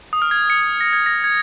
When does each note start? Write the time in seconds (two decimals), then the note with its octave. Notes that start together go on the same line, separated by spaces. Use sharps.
0.13 D#6
0.22 F6
0.31 G#6
0.50 C#7
0.81 A#6
0.93 G#6
1.06 A#6
1.24 G#6